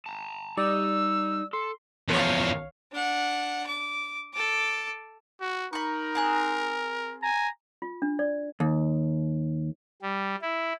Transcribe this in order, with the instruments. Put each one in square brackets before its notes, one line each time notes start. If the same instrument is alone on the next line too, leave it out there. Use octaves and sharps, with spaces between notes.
[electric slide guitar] A5 A#5
[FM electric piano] G3 D5 [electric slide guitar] D#4 [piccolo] E6
[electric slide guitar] A4 [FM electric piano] C6
[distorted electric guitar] E2 F3 [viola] C#5 F5
[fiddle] D4 F#5
D6
A4 D6
[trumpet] F#4
[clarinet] D#4 [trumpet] A#4 [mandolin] B5 C#6
[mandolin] C4 G#4 F#6
[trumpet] G#5 [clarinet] A#5
[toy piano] F4
D4
D5
[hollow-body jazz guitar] D#2
[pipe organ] G3
E4